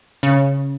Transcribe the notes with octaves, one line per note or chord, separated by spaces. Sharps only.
C#3